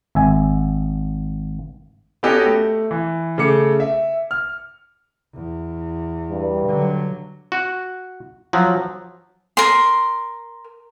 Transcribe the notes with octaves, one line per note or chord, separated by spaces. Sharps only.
G#1 E5 G#5
B3 C#4 F#4 G4 A4 D#5
A3
E3
C#3 A3 D6 C#7
E5
F6
E2
G2
D3 F#3
F#4
F3 F#3
A#4 C6